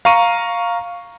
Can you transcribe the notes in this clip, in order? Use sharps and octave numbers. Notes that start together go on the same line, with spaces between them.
F5 A#5 C#6 D#7